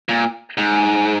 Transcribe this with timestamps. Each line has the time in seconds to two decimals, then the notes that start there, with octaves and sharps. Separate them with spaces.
0.09 A#2
0.57 G#2